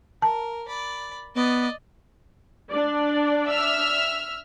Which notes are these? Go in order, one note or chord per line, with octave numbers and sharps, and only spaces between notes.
A#4 A5
D5 B5
B3 D5 D#5
D4 D5
E5 E6 F6